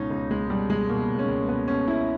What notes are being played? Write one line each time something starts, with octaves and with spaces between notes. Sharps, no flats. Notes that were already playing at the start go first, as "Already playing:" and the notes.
Already playing: C#2 B2 C#4 D#4
C#2
C#2 G#3
B2 G3
B2 G#3
B2 A#3
C#2
C#4
C#2
B2 B3
B2 C#4
B2 E4